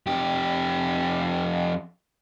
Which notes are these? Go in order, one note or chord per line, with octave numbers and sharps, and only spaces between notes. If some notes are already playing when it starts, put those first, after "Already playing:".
F2 G4